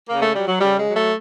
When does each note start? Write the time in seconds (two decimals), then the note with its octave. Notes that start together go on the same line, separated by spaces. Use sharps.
0.09 C#3 A#3
0.22 A3
0.35 F#3 G3
0.48 F#3
0.61 C#3 G3
0.78 G#3
0.87 F#3
0.96 A3